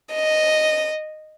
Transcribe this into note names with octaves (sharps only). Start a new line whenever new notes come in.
D#5